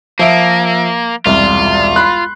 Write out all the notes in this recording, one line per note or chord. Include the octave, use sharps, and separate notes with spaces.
F3 A#3 E5 D7
E1 C2 F4
B5 C6 F#6